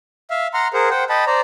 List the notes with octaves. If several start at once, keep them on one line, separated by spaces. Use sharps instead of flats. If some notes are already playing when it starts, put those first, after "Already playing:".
E5 F5
F#5 A#5 C6 F6
G#4 A#4 C5 F#5
C5 F#5 G5
D#5 G5 A5 B5
C5 D5 A#5